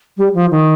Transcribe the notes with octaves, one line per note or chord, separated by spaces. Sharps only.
G3
F3
D#3